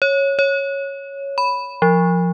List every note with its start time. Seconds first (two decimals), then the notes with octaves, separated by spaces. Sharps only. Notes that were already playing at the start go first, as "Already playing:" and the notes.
0.02 C#5
0.39 C#5
1.38 B5
1.82 F3